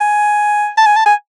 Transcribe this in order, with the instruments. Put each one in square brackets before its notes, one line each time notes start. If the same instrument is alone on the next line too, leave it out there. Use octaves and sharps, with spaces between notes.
[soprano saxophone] G#5
A5
G#5
A5
G#5